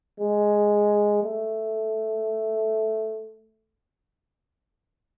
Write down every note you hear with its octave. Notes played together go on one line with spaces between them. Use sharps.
G#3
A3